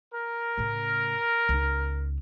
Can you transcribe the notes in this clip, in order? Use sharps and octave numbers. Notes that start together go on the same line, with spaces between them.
A#4
A2 C#3
C#2 D#4